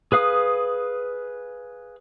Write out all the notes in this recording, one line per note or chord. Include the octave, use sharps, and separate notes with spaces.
G#4 B4 F5 D#6